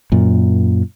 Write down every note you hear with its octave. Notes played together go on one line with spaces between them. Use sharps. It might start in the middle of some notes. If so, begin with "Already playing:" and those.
F#2 A#2